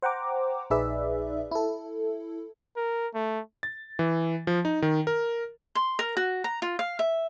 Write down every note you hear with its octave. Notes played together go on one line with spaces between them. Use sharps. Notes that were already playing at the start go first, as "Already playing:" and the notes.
C5 F#5 G5 A#5 D6
A#1 D#4 G#4 B4 D5 E5
E4 A4
A#4
A3
A6
E3
F3
D#4
D#3
A#4
C6
A#4
F#4
A#5
F4
F5
E5